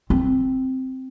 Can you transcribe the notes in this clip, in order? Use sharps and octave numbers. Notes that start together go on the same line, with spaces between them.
C4